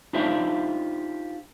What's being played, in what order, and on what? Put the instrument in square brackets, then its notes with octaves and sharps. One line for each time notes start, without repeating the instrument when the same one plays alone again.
[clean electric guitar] D4 D#4 F4 G4 C5 E5